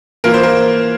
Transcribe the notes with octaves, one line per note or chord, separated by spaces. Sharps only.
E3 A#3 F4 A#4
C5
A#4